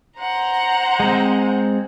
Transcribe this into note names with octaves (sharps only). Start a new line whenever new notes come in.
C5 F#5 A#5
G#3 C4